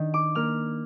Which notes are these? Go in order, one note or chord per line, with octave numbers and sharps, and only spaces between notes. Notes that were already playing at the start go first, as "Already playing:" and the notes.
Already playing: D#3 D4
D6
A#3 F6